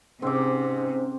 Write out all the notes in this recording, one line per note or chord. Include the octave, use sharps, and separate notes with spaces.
G#2 C3 C4 C#4 D6